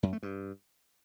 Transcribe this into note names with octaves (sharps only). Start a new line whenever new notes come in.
F#2
A3
G2